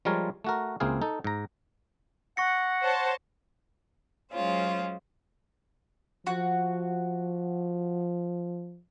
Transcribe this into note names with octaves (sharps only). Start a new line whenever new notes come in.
F3 G3 G#3 F4 A#4 C#5
A3 F#4 A#4
C#2 A#3 C4 E4 G#4 F5
D#4 A4
G#2 A#5
F#5 C#6 A#6 C#7
C5 C#5 A5
F#3 G#3 C#4 F4 C5
F3 F#4